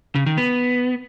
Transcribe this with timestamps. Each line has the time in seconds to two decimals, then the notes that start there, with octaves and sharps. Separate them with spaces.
0.15 C#3
0.26 D#3
0.37 B3